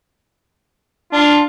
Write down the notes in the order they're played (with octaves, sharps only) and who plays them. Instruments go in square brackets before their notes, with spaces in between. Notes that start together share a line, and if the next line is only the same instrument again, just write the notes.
[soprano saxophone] D4 [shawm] F4